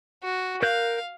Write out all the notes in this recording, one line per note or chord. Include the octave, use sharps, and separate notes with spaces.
F#4
A#4 F5 F#6 G6